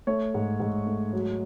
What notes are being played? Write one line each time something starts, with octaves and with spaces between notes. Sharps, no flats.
A3 C#5
G#2
G#2
A3
F#3